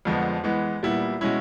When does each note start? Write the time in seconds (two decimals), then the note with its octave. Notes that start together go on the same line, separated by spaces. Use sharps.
0.05 F2 D3 F3 G#3 B3
0.44 E3 G#3 B3
0.83 A#2 G3 B3 E4
1.21 B2 G#3 C#4 E4